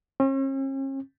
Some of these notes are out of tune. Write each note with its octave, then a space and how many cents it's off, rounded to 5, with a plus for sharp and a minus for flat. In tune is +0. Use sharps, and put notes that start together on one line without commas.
C#4 -45